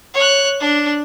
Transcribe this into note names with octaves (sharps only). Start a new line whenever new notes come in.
C#5 F#6
D4